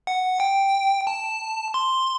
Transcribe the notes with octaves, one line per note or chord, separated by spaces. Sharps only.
F#5
G5
A5
C6